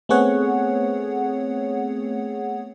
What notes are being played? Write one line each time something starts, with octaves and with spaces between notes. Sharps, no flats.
A3 B3 C4 G#4 C#5 F#5